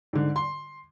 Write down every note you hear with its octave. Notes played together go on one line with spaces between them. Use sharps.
G#2 D3
C6